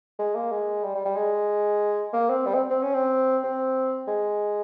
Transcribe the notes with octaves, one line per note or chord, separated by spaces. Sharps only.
G#3
A#3
G#3
G3
G3
G3
G#3
A#3
C4
G3
C4
C4
C#4
C4
C4
G#3